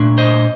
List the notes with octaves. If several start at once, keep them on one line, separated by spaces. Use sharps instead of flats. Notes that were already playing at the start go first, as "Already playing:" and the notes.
Already playing: A#2 A3 D4
C5 D#5